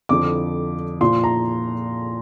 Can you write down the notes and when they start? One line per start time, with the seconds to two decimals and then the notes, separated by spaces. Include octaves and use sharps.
0.09 F2 D3 F3 D6
1.01 A#2 F3 C6
1.24 A#5